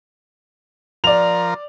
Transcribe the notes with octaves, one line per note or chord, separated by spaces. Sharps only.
F3 A#4 D5 F7